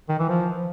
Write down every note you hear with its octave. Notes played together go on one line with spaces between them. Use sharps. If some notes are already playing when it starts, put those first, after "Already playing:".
D#3
E3
F3